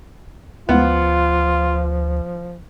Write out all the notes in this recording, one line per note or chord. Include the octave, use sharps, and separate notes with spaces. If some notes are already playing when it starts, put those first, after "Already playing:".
D2 F3 B3 F4